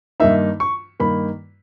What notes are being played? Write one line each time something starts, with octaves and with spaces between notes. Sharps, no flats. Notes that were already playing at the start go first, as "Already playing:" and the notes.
G2 D#3 A#3 D#4 E5
C#6
G2 D#3 A#3 D#4 B5